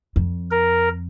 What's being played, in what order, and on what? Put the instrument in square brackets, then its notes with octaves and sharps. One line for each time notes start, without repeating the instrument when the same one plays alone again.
[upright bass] F2
[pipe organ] A#4